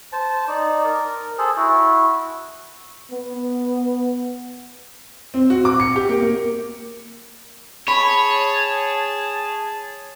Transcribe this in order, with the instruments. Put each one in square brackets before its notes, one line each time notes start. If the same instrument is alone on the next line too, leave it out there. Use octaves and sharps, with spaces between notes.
[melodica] C5 A5
D#4 D5
A#4
G#4 A4 C5
E4 F#4
[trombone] B3
[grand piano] C4
F#4
D6
C#7
G4
A#3
A#3
[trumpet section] G#4 A5 [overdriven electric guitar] C#5 [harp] B5